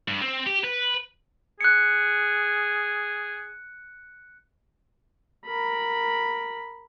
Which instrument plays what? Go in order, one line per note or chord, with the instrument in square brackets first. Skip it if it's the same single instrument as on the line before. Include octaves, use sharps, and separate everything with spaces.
[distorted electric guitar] G2
C4
G4
B4
[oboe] G#4 [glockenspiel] F#6 C#7
[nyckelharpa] A#4 B5